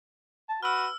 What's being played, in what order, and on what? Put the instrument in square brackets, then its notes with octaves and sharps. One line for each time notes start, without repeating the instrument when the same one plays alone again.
[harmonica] A5
[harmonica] F#4 B4 [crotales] E6 F6